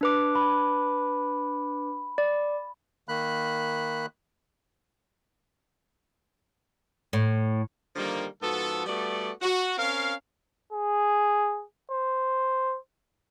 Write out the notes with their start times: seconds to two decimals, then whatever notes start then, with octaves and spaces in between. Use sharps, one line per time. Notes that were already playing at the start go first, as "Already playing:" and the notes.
0.01 D4 B4 D6
0.35 B5
2.18 D5
3.08 D#3 A#3 B5 F#6
7.13 A2
7.96 D3 D#3 F3 G3 A#3
8.42 G#2 F3 B3 F#4 A4
8.86 G3 A3 B3 F#4 D5
9.42 F#4
9.78 C4 C#4 A#4 F5
10.72 G#4
11.91 C5